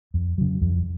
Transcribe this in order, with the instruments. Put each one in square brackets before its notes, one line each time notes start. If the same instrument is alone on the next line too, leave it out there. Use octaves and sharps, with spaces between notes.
[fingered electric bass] F2
C#3 F#3
F2